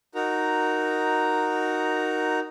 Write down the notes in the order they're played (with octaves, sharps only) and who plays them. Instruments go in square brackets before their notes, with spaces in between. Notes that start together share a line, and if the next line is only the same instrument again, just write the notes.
[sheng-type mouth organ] D#4 F#4 A#4 A#5